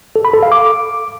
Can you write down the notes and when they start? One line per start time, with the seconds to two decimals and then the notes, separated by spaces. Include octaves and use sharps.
0.16 A4
0.25 B5
0.34 A4
0.43 F5
0.52 D6